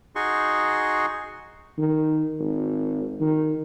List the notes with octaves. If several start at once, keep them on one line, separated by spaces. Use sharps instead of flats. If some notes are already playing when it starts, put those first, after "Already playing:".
D#4 F#4 G#4 C6 C#6
D#3
G#1
D#3